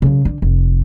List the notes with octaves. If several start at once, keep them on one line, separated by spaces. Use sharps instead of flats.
C#3 F#3
D3
F1